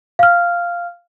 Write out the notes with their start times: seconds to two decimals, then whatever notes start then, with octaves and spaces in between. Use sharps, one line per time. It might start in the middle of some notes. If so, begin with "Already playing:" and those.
0.19 F5 F6